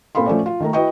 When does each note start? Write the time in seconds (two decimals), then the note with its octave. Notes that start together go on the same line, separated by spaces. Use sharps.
0.15 A#2 C4 A4 F5 B5 C6
0.26 F3 A3 C#4 D5
0.46 F4
0.60 D#3 A3 A#5
0.73 E4 F#4 B4 D#5 G5 C#6